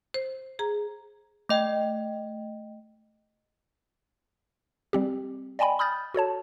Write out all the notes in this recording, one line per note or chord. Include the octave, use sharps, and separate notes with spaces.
C5
G#4 A#5
A3 D#5 G5
G3 C4 G4
D5 D#5 G5 G#5 B5
B5 D#6 F6 G6 A6
F#4 A4 C#5 A5